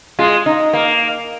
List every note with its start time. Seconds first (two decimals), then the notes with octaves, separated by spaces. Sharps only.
0.19 G#3 F4
0.46 D#4
0.73 A#3